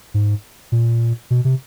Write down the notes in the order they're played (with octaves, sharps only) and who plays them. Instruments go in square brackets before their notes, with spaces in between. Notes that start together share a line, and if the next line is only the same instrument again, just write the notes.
[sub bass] G#2
A#2
B2
C3